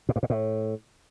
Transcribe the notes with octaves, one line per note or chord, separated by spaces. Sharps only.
A2
G2
A#2
A2